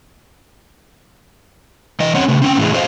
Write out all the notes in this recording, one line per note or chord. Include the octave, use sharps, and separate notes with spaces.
E3 D#5
C4 C#4 C#5 F#5
C#3 A3
C4 C#4 G5
A2 E3 G3 G#3
F#4 A4 C5 D5 D#5 F5